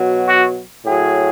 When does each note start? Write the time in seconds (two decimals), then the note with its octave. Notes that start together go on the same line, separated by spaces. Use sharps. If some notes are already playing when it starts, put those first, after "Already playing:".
Already playing: B2 F#3
0.27 F#4
0.85 A2 F#3 G#4